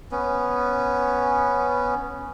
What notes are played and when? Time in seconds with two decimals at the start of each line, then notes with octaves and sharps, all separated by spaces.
0.12 B3 C#4